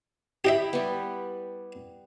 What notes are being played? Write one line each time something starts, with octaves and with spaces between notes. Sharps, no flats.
E4 G4 D#5 E5 G5 B5
G3 B3